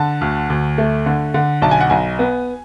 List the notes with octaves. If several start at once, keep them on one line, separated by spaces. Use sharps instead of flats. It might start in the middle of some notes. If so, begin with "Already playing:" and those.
Already playing: D3 A5
D2
D2
A3
D3
D3
B1 A5
G#5
F#5
B1 G#5
B3